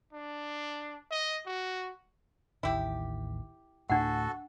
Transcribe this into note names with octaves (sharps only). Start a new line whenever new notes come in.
D4
D#5
F#4
A1 D#2 D#3 E4 G4
D2 A2 D4 F#4 A4 F#5